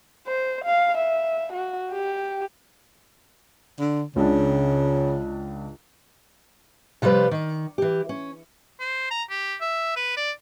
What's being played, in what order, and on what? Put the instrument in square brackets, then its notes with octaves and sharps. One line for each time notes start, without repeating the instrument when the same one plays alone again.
[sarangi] C5
F5
E5
F#4
G4
[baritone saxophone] D3
[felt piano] C#2 D4 [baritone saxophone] C#3
[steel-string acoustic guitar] C3 F3 G3 B4 D5
D#3
E3 G4
C#4
[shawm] C5
A#5
G4
E5
B4
D5